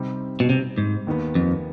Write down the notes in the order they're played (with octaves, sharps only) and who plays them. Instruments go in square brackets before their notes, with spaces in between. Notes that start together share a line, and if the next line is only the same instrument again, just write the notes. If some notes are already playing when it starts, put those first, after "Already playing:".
Already playing: [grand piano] C3 G3 C4 D#4
[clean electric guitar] B2
C3
G#2
[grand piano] D#2 D#3 B3
[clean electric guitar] F2